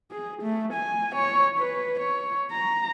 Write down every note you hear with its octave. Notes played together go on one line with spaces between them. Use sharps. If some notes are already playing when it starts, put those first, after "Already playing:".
G#4
A3
G#5
C#5
B4
C#5
A#5